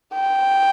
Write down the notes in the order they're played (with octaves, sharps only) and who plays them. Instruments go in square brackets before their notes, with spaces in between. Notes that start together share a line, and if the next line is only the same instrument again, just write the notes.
[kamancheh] G5